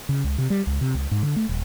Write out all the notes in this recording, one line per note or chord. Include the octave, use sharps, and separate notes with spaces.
C#3
C#2
C3
G3
C#2
C3
C#2
G#2
D3
A3
D#1